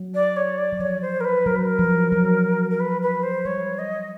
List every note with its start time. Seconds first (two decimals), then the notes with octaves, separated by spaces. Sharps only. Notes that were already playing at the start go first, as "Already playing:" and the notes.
Already playing: F#3
0.14 D5
0.36 C#5
0.58 D5
0.72 F#3
0.79 F3 C#5
1.01 C5
1.20 A#4
1.24 B4
1.46 F#3 A#4
1.55 B4
1.65 A#4
1.79 F3
2.12 F#3
2.70 A#4
2.79 B4
3.01 B4
3.23 C5
3.45 G3 C#5
3.78 D#5